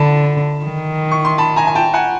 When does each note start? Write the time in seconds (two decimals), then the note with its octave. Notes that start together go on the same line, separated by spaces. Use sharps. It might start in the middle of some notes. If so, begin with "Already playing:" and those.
Already playing: D3 A5 B5
0.65 D#3
1.11 C#6
1.25 C6
1.38 A5 B5
1.56 G#5 A#5
1.67 G#5
1.75 G5 A5
1.94 F#5 G#5